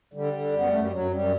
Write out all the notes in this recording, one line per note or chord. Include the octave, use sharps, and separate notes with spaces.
D3 G3
D3
F#2 B3
F#2 A3
G3
F#2 F#3
F#2 G3